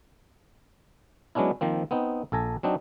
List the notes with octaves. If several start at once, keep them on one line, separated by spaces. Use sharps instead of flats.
F#3 G#3 B3 C#4 D4 E4
D#3 F3 A#3 C4
B3 C4 D#4
A#1 A4 G#5 A#5
F#3 C4 D4 D#4